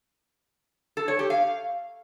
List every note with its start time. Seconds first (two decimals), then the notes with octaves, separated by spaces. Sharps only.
0.97 A4
1.08 C#5
1.19 G4
1.30 F5